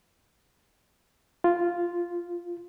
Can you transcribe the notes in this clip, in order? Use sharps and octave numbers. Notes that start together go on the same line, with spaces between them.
F4